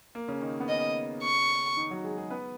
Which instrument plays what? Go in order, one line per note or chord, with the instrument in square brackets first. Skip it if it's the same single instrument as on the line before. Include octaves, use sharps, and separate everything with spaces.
[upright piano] A#3
C#3 C#4
D#3 D#4
B3
[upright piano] C#3 C#4 [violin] D#5
[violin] C#6
[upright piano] D#3 D#4
F#3 F#4
G#3 G#4
G#3 G#4
B3 B4